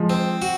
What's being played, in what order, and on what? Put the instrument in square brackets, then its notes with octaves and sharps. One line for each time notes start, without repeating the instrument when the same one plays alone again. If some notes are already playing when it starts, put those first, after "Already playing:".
Already playing: [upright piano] F3 G#3
[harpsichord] C4
F#4